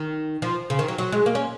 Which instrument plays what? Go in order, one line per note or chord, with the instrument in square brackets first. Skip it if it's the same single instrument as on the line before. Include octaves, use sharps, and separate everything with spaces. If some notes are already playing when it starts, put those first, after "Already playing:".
Already playing: [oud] D#3
F3
C#3
D#3
F#3
F#3
G#3
A#3
C#4